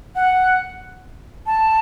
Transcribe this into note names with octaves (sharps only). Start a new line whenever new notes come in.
F#5
A5